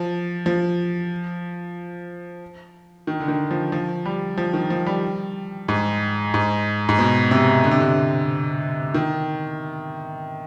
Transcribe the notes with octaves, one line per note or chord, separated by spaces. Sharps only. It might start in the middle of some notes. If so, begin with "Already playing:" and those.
Already playing: F3
F3
D#3
D3
D#3
F3
F3
G3
F3
D#3
F3
G3
G#2
G#2
G#2
B2
C3
D3
C3
D3
D#3